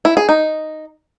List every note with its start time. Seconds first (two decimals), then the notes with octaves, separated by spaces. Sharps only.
0.05 E4
0.17 G#4
0.29 D#4